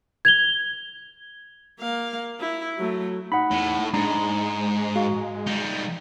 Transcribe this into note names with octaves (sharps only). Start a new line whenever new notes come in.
G#6 F7 G7
A#3 F5
E4
F#3 A3
D#4 F#5 B5
E2 A2
A3
G#2 G#3 D4 D#4 A#5
F#4 F5
G3 D#4